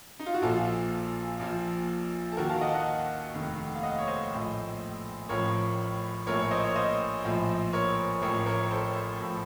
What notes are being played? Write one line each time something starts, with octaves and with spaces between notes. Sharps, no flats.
D#4
F4
F#4
A#1 A#2 F3 F4 A4
A#1 A#2 F3
A4
D#2 D#3 F#4 A#4
F5 A5
D#5 F#5
A5
D#5 F#5
F1 D#2 D#3
F5
D#5 F#5
C#5
C5 D#5
A#1 A2 F3
A1 A2 F3 A#4 C#5
A#1 A2 F3 A#4 C#5
C#5
C5 D#5
C#5
C5 D#5
A#1 A2 F3
A#4 C#5
A1 A2 F3 A#4 C#5
A#4 C#5
A4 C5
A2 F3